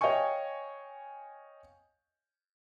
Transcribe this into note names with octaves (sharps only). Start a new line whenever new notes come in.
C#5 D#5 F5 G5 G#5 C#6